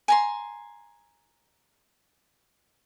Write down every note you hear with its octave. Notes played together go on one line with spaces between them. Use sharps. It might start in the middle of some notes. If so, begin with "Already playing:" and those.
G#5 A#5 C6